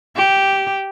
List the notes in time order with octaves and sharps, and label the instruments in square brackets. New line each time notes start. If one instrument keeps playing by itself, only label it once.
[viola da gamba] G4